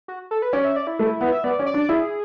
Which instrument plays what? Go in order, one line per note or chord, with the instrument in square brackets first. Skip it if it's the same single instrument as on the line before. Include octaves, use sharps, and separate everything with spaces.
[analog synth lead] F#4
A4
B4
[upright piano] C#4 [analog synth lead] D5
[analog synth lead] E5
D5
E4
[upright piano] A3
B3
[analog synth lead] E5
[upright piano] B3 [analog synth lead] D5
[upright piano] C#4
[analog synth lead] D5
[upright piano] D4
[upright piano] E4 [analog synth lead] G#4